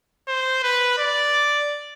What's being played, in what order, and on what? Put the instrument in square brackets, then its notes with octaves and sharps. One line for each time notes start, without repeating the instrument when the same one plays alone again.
[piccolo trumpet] C5
B4
D5